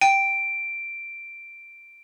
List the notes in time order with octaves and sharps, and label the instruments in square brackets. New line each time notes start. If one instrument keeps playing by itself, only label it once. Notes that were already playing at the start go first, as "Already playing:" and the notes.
[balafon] G5 [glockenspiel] D7